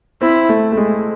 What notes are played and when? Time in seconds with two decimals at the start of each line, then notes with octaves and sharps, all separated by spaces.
0.21 C4 E4
0.49 A3
0.72 A3
0.77 G#3